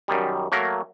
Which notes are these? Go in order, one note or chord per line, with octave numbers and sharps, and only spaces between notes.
F#2 D#3 G3
F#3 A3 A#3 A#4